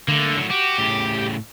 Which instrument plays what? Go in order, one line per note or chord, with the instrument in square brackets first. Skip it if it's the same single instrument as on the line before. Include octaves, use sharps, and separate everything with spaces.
[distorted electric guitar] D3 [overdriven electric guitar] A3 A#3
[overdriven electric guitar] A2 F#3
[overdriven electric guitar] F#4 [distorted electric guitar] G4
[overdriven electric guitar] A2 C#3